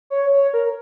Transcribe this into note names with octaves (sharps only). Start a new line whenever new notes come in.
C#5
C#5
A#4